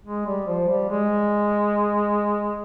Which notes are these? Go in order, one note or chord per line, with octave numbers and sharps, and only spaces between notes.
G#3
G3
F3
G3
G#3